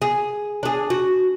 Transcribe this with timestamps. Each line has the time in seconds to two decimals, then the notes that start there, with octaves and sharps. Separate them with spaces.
0.02 G#4
0.63 D4 G#4
0.90 F#4